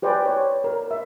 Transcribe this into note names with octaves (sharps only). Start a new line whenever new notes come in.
G4 B4 C5 D5 G5 G#5
B4 C#5
A#4
E5